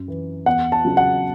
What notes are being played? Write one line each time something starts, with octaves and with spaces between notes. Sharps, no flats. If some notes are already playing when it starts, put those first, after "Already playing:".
Already playing: F#2
E3
E2 F#5
A5
C#3 F#3
F#5